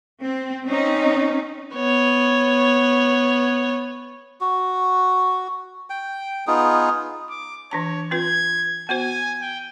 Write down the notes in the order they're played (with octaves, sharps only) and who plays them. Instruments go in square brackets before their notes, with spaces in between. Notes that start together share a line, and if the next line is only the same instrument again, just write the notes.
[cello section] C4
C4 C#4 D#4
[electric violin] B3 C#5
[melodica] F#4
G5
B3 D#4 F4 G#4
[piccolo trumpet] D6
[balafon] E3 D4 A5 [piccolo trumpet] C#5
[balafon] C4 F4 B4 [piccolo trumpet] G#6
[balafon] B3 F#4 C5 [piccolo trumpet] G#5
[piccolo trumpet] G5